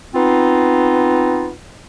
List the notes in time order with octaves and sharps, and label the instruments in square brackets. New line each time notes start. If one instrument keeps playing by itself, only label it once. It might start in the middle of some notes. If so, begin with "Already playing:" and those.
[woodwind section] B3 C4 D#4 F4